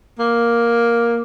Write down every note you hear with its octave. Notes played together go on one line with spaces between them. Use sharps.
A#3